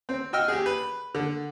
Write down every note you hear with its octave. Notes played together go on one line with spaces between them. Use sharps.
C4
F#4 D#5 G5 E6 F6
G4 G#4
B4
D3